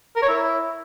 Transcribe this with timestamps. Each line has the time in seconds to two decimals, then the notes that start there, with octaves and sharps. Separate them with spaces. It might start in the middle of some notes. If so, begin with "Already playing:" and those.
0.16 A#4
0.23 C#5
0.29 E4